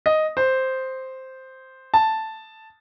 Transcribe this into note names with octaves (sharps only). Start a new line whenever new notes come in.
D#5
C5
A5